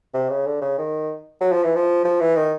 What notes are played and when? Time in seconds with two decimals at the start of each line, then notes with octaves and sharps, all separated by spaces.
0.14 C3
0.30 C#3
0.46 D3
0.62 C#3
0.78 D#3
1.41 F#3
1.52 F3
1.64 E3
1.75 F3
2.05 F3
2.20 E3
2.36 D#3